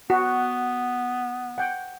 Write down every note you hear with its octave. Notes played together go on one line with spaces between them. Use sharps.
B3 F#4
F#5 G5